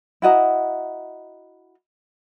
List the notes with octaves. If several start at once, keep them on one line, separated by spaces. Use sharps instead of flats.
E4 F#4 D#5 A#5